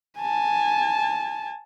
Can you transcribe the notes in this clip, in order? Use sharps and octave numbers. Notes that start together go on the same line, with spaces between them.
G#5 A5